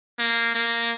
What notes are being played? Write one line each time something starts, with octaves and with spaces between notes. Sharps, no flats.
A#3
A#3